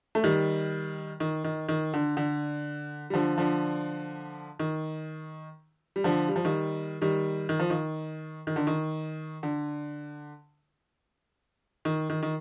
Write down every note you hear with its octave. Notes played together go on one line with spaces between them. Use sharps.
A3
D#3 G3
D#3
D#3
D#3
D3
D3
G3
D3 F3
D3 F3
D#3
G3
D3 F3
G3
F3
D#3 G3
D#3 G3
D#3
F3
D#3
D#3
D3
D#3
D3
D#3
D#3
D#3